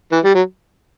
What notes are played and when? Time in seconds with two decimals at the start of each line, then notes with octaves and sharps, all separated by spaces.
0.12 E3
0.24 G3
0.35 F#3